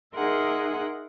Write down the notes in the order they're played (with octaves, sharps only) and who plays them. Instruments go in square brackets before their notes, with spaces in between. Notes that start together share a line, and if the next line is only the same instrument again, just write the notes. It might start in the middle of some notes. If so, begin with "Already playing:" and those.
[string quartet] D#4 G#4 A#4 E5 F#5 C6